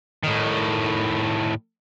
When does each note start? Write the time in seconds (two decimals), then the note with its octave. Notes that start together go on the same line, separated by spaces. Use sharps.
0.23 A2 D#3